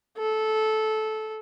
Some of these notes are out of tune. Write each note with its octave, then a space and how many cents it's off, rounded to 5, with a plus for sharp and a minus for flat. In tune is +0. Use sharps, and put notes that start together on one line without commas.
A4 -15